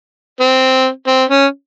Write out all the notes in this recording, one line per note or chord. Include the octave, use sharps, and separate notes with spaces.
C4
C4
C#4